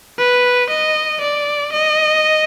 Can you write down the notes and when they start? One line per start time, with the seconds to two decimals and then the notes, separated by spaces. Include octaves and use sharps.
0.19 B4
0.70 D#5
1.22 D5
1.73 D#5